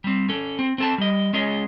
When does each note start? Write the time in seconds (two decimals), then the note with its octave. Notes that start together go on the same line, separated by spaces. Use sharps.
0.04 G3 C4
0.29 C#4 A4
0.59 C4
0.78 C4 A4 A5
0.98 G3 D#5
1.33 G#3 C#4 G#4 D#5